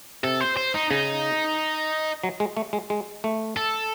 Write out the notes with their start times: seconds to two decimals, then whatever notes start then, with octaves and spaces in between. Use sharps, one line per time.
0.23 C3 A4
0.40 C5
0.57 C5
0.74 D#4
0.90 C#3 D#4
2.24 F#3
2.40 G#3
2.57 A3
2.73 G#3
2.90 G#3
3.24 A3
3.57 A4